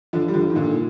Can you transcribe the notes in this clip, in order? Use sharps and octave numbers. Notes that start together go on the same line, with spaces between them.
D3 F3
G3
D3 F3
D#3
A#2 D3